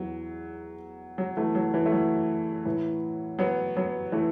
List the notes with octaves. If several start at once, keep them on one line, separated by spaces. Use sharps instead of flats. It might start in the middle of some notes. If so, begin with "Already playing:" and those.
Already playing: E2 E3 F#3
F#3
E3 A3
F#3
E3
A3
F#3
A2 E3
F#3 B3
F#3 B3
E3 A3